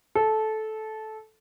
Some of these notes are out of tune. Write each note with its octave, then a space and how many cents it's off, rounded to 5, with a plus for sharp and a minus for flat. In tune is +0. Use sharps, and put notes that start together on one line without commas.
A4 -15